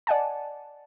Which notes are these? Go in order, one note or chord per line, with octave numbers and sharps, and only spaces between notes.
D5 D#5 F#5 G#5 A5